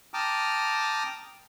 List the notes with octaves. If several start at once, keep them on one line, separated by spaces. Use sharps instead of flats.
G5 A5 A#5 D6 D#6 F6